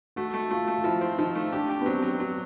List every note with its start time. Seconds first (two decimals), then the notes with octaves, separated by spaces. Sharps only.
0.16 A3 F#4
0.34 A3
0.51 A3 F4
0.68 A3
0.76 F4
0.84 F3 E4
1.01 C4
1.18 F3 D#4
1.35 A3
1.52 D4 G4
1.69 G4
1.81 B3
1.86 F#3 C4
2.03 F#3
2.20 F#3 B3